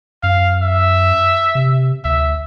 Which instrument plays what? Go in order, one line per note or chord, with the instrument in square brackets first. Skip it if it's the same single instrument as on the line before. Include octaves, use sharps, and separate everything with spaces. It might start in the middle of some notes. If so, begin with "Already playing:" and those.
[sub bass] F#2 [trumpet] F5
[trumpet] E5
[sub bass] C3
[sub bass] D2 [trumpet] E5